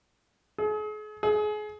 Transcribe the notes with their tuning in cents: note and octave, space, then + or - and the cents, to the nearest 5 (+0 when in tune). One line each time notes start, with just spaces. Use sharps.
G#4 +40
G#4 +30